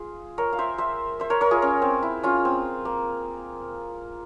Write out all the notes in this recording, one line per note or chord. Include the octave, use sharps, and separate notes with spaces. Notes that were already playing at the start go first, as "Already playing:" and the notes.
Already playing: F4 G#4
A#4 C#5
F5
C5 E5
C5 E5
C5 E5
A#4 C#5
A#4 C#5
F4 G#4
C#4
C4
E4
C#4 F4
C4
A#3